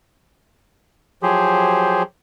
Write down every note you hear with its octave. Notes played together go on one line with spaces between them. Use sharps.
F3 F#3 G4 G#4 C5